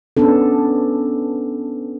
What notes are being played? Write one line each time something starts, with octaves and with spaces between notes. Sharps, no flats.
B3 C#4 D4 A4